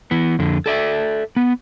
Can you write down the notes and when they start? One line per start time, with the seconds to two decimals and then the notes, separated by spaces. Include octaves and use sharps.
0.11 E3 B3
0.39 F2 D3
0.66 A4 D5 E5
1.36 B3